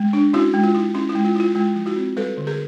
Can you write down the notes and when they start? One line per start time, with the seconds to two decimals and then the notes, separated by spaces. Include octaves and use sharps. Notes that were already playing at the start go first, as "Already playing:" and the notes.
Already playing: G#3
0.13 D4
0.33 C#4 E4 F#4
0.53 G#3
0.64 F4
0.75 E4
0.94 C#4 E4
1.09 E4
1.15 G#3
1.25 F4
1.35 E4 F4
1.55 G#3 F4
1.76 F3
1.86 E4 F#4
1.96 C4
2.17 G3 A4 B4
2.37 D3
2.47 G#4 A#4